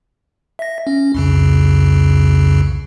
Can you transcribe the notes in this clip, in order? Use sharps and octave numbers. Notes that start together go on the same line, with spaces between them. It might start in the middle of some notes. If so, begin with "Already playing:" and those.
E5 A#6
C#4
C2 F2 C#3